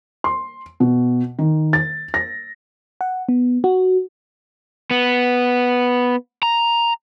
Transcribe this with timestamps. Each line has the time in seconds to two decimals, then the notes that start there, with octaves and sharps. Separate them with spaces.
0.24 C6
0.80 B2
1.39 D#3
1.73 A6
2.14 A#6
3.01 F#5
3.29 B3
3.64 F#4
4.91 B3
6.43 A#5